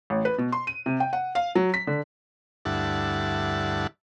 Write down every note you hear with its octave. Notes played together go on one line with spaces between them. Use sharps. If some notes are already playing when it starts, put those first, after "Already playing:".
A1
B4
B2
C6
D#7
C3
G5
F#5
F5
F#3
B6
D3
D2 G2 E4 F#5 A5